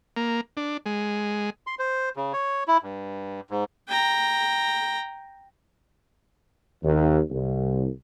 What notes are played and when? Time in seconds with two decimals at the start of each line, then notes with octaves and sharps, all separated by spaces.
0.17 A#3
0.57 D4
0.86 G#3
1.67 C6
1.79 C5
2.16 C#3
2.33 C#5
2.68 E4
2.83 G2
3.50 G#2
3.89 G5 A#5
6.83 D#2
7.30 C2